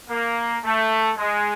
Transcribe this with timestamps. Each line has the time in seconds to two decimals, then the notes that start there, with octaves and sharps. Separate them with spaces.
0.10 A#3
0.63 A3
1.18 G#3